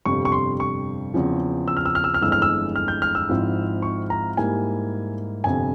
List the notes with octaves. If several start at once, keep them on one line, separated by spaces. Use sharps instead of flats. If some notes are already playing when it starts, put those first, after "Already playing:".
G1 F2 C3 G3 C#6
C#6
C6
C#6
E2 C#3 F3 C4
E6
F6
E6
F6
E6
F6
G1 F2 E3 G#3 E6
F6
E6
F6
G6
F6
E6
G#1 G#2 F3 C4 E4
C#6
A#5
G#2 G3 A#3 E4 G#5
G1 F2 C3 G#5